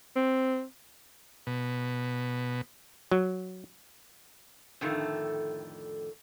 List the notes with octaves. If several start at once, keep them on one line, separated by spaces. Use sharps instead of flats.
C4
B2
F#3
F2 A2 D3 D#3 A3